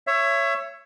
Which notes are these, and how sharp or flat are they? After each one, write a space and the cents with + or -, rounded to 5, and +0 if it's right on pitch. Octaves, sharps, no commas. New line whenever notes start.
C#5 +0 E5 +25